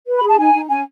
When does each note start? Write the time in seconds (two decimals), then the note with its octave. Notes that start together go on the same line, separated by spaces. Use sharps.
0.07 B4
0.17 B5
0.23 G#4
0.28 A5
0.38 D#4 G#5
0.54 D#4
0.69 C#4 G#5